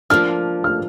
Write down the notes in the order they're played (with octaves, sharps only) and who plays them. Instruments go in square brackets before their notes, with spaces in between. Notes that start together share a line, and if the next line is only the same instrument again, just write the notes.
[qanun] F3 A#3 D4 [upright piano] F6
[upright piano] F6